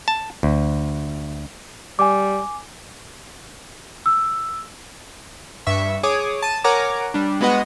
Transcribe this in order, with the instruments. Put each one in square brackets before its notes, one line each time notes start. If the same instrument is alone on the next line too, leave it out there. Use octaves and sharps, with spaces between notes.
[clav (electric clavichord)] A5
D2
[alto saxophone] G3 [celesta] G#5 D6
[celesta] E6
[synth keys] G2 E5 C#6
G#4 C#5 D6 D#6
A5 D#7
A#4 C#5 F#5 G#5 A#5 D6
G3 D4
G#3 B3 F#4 B4 D#5 F#5